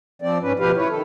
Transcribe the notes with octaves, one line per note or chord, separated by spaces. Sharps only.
F3 C4 D5
G#2 C#4 B4
D2 B2 F3 G4 B4 F5
E4 B4 C#5
D#3 A4